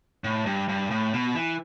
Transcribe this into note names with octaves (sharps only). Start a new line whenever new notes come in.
A2
G2
G2
A2
B2
E3